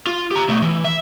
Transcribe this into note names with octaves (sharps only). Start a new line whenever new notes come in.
F4
G4 A#5
B2 A3
E3
E5